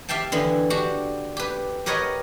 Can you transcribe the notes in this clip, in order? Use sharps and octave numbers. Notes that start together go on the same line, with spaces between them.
G4 E5 F5 G5 A5
D3 E3 B3 E4
D4 F#4 G4
G4 B4
G4 A#4 B4 C#5 D#5 F#5